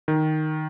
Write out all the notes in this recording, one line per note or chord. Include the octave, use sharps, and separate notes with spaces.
D#3